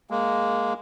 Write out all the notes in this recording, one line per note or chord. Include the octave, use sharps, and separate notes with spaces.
G#3 A#3